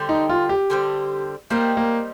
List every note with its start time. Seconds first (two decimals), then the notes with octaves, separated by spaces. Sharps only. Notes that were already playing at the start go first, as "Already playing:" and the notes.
Already playing: D3 G3 C4
0.09 D#4
0.29 F4
0.49 G4
0.70 D3 G3 C4
1.50 G3 A#3 C4 D#4
1.77 A#3